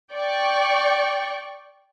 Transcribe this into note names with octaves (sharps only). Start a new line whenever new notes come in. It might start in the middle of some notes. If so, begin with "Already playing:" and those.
D5 G5 C#6